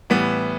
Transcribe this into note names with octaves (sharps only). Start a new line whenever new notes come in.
A2 E3 G3 B3